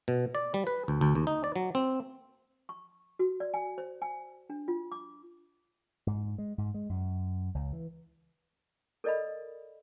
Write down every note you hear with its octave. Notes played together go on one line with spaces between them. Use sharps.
B2
D5
G3
B4
D2
D2
D#2
D#4
D5
F#3
C4
C#6
F#4
D5
G#5
C5
G#5
D4
F4
D6
G#2
G#3
G#2
G#3
F#2
C#2
E3
A4 A#4 D5 D#5 F5 B5